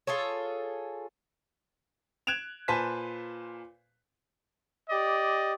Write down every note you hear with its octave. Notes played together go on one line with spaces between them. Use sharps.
F4 G#4 A4 C#5
F#6 G#6 D7 E7 F7
A#2 B4 C5 G#5 A5 B6
G4 D5 D#5